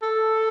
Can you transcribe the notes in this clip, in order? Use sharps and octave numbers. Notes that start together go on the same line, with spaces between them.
A4